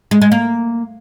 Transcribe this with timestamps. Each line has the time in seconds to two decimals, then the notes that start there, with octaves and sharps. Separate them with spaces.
0.11 G#3
0.22 G#3
0.32 A#3